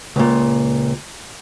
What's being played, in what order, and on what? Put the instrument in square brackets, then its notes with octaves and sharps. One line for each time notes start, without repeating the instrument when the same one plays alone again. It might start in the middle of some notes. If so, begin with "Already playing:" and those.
[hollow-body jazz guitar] C#2 A#2